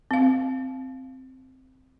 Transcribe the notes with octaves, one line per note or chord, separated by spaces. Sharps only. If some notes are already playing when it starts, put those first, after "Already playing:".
C4 F5